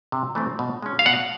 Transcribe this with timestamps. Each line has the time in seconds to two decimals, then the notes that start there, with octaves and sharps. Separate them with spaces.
0.12 C3
0.35 E3 A3 C4
0.59 B2
0.82 G#3 C#4
0.99 F5
1.06 B2 F#5